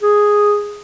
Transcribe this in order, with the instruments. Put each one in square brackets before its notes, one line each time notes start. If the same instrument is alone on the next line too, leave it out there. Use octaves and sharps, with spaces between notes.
[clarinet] G#4